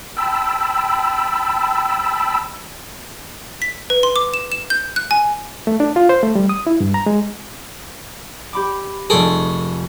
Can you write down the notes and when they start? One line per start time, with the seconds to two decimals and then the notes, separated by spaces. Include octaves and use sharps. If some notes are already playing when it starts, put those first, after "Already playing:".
0.17 G5 A5 B5 E6
3.62 B6
3.90 B4
4.03 C6
4.16 D6
4.34 E7
4.52 E7
4.70 G6
4.96 F#6
5.11 G#5
5.67 A3
5.80 D4
5.96 F4
6.09 C5
6.23 A3
6.35 G3
6.49 D#6
6.67 E4
6.80 G2
6.94 A#5
7.06 G#3
8.53 G4 B5 D6
9.10 F1 G#4 A4 C#6 D7